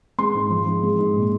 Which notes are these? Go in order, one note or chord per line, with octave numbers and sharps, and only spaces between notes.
G#3 C6
G#2
F3
G#2
G#3
G#2
A#2